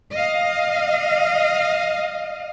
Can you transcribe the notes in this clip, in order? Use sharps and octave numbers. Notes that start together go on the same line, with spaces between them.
D#5 F5